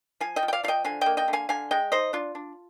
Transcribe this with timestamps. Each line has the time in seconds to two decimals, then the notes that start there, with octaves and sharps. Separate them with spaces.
0.20 F3 F5 G#5
0.36 D#5 G5
0.43 F3
0.48 G5
0.53 D5 F5
0.63 F3 F5
0.68 D#5 G5
0.85 D3 F5 G#5
1.01 A#3 D#5 G5
1.17 D#5 G5
1.28 D3
1.33 F5 G#5
1.49 D3 F5 G#5
1.71 G#3 D#5 G5
1.92 D#4 C5 D#5
2.13 D4 F4
2.35 D4